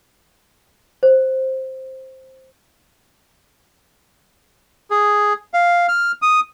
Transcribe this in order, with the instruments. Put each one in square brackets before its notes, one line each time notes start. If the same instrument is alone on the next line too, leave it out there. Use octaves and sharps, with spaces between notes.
[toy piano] C5
[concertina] G#4
F5
F6
D#6